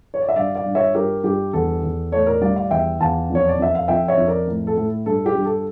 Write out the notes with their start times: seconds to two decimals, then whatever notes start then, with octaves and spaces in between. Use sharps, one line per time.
0.14 C#5
0.21 D5
0.29 E5
0.36 G2 D5 F5
0.55 D5 F5
0.65 G2
0.75 C#5 E5
0.95 G2 G4 A#4
1.23 G2 G4
1.53 E2 A4
1.83 E2
2.12 A2 A4 C#5
2.27 A#4 D5
2.41 G3 D5 F5
2.56 D5 F5
2.71 E2 E5 G5
3.00 E2 F5 A5
3.30 F2
3.35 C#5
3.48 D5
3.59 F2 E5
3.75 F5
3.88 F2 E5 G5
4.08 C#5 E5
4.17 F2
4.28 A#4 D5
4.47 A2
4.67 A4
4.77 A2
5.06 G2 A4
5.26 G4
5.35 G2
5.45 A4